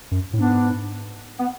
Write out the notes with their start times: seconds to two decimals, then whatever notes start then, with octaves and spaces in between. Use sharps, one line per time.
0.11 F#2
0.33 A2
0.38 G#2 B3 D4
1.39 B3